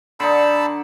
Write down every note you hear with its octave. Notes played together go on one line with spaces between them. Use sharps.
D3 D#4 A5 B5 E6